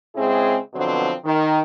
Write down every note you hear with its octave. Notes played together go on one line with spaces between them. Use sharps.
C#3 G#3 C4 E4 G#4
B2 D3 F3 F#3 B3 C4
D#3